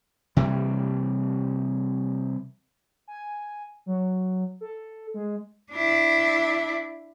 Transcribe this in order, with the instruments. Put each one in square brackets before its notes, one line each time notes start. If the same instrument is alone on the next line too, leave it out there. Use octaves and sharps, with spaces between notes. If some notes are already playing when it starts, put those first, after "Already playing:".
[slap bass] C3 E3 G3
[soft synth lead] G#5
F#3
A4
G#3
[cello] D4 E4